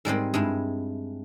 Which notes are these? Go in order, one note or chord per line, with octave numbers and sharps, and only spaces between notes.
G#2 G3 G#3 C4
G2 G#3 E4